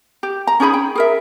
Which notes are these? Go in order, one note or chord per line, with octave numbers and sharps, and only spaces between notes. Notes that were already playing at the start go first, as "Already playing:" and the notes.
G4
A#5
C#4 D#4 G#4 B5
G5
G#4 A#4 E5